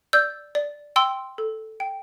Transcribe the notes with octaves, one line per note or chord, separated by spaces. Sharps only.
D5 E6 G6
D5
G5 C6 E6
A4
G5